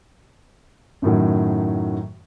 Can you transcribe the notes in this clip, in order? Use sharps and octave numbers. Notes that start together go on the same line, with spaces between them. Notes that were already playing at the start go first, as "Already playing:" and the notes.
F#2 A2 D#3 F#3